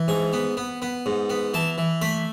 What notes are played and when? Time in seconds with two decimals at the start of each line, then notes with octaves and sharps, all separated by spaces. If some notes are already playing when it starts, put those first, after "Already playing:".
Already playing: E3
0.08 G#2 G#5
0.33 B3
0.57 B3
0.82 B3
1.06 G#2
1.30 B3
1.54 E3 A5
1.78 E3
2.02 A3 B5